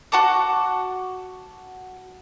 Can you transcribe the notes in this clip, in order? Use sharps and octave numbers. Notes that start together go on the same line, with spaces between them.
F#4 F#5 A5 D6